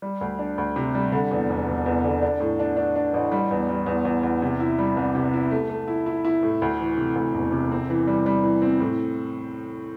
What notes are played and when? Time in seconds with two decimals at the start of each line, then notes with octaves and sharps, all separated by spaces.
0.02 G3
0.21 D2
0.39 D4
0.58 D2
0.76 C3
0.95 G3
1.12 D3
1.31 E2
1.50 E1
1.68 E1
1.86 E2
2.04 D3
2.22 D4
2.40 A2
2.59 D4
2.77 D4
2.96 D4
3.14 A1
3.32 G3
3.51 E2
3.69 G3
3.86 E2
4.05 E2
4.23 E2
4.42 C3
4.60 E4
4.79 G3
4.97 C2
5.15 C3
5.34 E4
5.51 A3
5.70 A3
5.88 E4
6.06 E4
6.25 E4
6.43 A2
6.62 D2
6.79 E3
6.98 C3
7.16 D2
7.34 E1
7.52 C3
7.72 C4
7.90 E3
8.07 G3
8.26 G3
8.43 E3
8.62 C4
8.80 A2